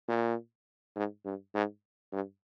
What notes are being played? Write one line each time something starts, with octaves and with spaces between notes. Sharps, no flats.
A#2
G#2
G2
G#2
G2